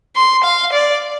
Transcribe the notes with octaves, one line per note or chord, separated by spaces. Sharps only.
C6
F5
D5